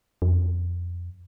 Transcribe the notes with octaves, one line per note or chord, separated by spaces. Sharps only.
F2